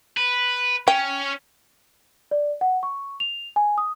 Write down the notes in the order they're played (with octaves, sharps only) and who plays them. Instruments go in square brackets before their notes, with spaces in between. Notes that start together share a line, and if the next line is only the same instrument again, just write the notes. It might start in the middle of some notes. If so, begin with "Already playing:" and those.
[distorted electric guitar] B4
[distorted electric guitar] C#4 [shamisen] G5
[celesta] D5
F#5
C#6
F7
G#5
D#6